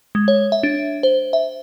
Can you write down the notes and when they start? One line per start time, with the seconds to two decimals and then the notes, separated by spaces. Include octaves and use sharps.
0.15 G#3
0.28 C#5
0.52 E5
0.63 D4
1.03 C5
1.33 E5